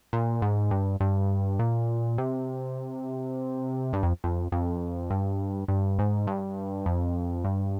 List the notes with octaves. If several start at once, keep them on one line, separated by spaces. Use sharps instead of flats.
A#2
G#2
G2
G2
A#2
C3
G2
F2
F2
F2
G2
G2
G#2
G2
F2
G2